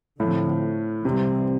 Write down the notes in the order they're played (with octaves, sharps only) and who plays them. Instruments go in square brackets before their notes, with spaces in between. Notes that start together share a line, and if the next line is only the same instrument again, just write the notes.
[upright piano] A2 [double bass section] D3 F3 A3 C4
[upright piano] C3 [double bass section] E3 G3 C4